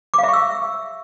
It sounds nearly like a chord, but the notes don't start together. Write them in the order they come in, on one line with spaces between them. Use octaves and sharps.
D6 F5 E5 C#6 E6